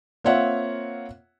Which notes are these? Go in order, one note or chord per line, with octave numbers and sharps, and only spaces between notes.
A#3 C4 F4 C#5 E5 F#5